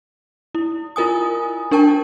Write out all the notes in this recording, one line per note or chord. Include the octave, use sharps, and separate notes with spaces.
E4
E4 F4 A#4 G#5 D#6
D4 A#4 G5 A5 C#6